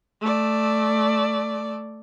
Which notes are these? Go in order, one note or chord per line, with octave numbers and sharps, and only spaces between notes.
A3 D5